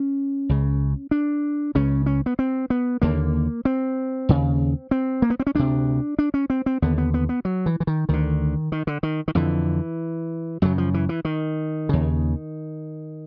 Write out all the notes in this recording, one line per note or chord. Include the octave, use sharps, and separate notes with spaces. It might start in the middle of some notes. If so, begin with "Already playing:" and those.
Already playing: C#4
C#2 C#3
D4
C#2 C#3 C#4
C#4
B3
C4
B3
D#2 D3 A#3
C4
D#2 C#3
C4
A#3
B3
C4
C#4
D2 C3 D4
D4
C#4
C4
C4
D#2 D3 B3
B3
B3
B3
F#3
E3
E3
D#3
D2 D3 D#3
D#3
D3
D#3
D#3
F2 D3 E3
F#2 C#3 F#3
F3
E3
E3
D#3
D#2 C#3